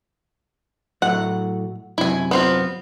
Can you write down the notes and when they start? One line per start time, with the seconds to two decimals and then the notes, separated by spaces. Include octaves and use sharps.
1.02 A2 F#3 A3 F#5
1.98 F#2 C3 F#3 E4 G#5
2.31 B3 C4 F4